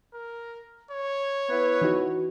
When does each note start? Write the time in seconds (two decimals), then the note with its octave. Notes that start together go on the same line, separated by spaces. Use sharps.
0.14 A#4
0.91 C#5
1.49 B3 E4 B4
1.81 E3 D#4 F#4